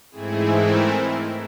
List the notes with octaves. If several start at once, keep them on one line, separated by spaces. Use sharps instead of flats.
G#2 E3 A3 C4 E4 G#4
A#4